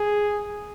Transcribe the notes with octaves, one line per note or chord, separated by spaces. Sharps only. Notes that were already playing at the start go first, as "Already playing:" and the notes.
Already playing: G#4